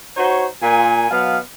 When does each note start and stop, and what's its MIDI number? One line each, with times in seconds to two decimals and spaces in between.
0.17 0.46 63
0.17 0.46 66
0.17 0.46 72
0.17 0.46 73
0.63 1.10 46
0.63 1.10 80
1.11 1.38 47
1.11 1.38 54
1.11 1.38 59
1.11 1.38 77